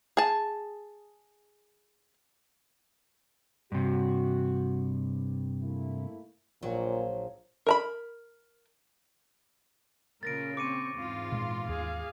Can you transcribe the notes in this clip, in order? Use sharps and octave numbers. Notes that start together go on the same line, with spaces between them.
G#4 A5
G2 C3 F#4
A3 A#3 E4
A#1 A#2 F#3
A#4 A#5 B5
A#2 C#3 A#4 A6 A#6 D7
C4 C#6 D6 C#7 D#7
E2 G#2 C4 F4
A#2 G#3 C6
D#2 G#4 F5